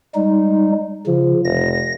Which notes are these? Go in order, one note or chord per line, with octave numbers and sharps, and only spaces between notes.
G3 G#3 D#4
C#3 F3
F1 A#6